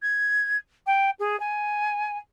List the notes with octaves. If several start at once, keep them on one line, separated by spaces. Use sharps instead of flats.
G#6
G5
G#4
G#5